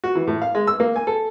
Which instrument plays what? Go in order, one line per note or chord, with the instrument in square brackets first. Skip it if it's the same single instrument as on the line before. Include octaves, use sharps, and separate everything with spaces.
[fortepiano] F#4
E3
A2
F5
G#3
E6
A#3
G#5
A4